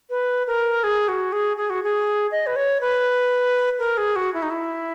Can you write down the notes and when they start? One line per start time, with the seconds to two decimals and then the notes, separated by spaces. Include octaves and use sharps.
0.10 B4
0.47 A#4
0.84 G#4
1.08 F#4
1.32 G#4
1.57 G#4
1.70 F#4
1.83 G#4
2.32 D#5
2.47 B4
2.56 C#5
2.81 B4
3.79 A#4
3.97 G#4
4.16 F#4
4.34 E4
4.42 D#4
4.50 E4